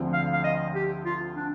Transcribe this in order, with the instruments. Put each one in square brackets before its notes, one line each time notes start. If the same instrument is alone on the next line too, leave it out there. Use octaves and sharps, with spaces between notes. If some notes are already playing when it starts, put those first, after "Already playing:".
Already playing: [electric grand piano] D2 D3 F3 C4
[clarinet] F5
F5
D#5
G4
F4
D4